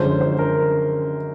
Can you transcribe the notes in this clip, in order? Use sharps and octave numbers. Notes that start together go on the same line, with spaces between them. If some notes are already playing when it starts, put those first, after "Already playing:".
Already playing: F#2 D3 F3 G#3 C#4 C5
C5
A#4